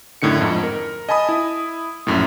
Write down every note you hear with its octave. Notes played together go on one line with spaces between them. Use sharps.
F#2 A2 D3 D#3 C#7
F2 G#2
A#4
D#5 G#5 A5 B5 D#6
E4
A#1 F#2 A2